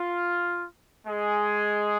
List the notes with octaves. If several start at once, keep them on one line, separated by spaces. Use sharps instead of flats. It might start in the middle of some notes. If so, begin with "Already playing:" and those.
Already playing: F4
G#3 G#4